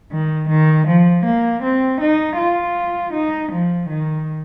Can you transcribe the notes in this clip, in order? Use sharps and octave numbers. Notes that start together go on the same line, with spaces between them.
D#3
D#3
F3
A#3
C4
D#4
F4
D#4
F3
D#3